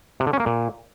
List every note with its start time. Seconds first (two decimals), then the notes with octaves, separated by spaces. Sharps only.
0.20 C3
0.27 D3
0.33 C#4
0.40 A#3
0.46 A#2